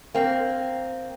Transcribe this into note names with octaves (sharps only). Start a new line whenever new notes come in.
A#3 C4